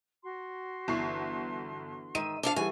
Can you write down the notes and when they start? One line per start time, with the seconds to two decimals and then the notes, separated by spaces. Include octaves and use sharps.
0.23 F#4 C6
0.88 G1 D3 E3 C#6 C7
2.15 G#2 D#3 E5 D#7
2.43 D4 A4 F5
2.56 E3 G3 G#4 A4 F#5 G#5 C#6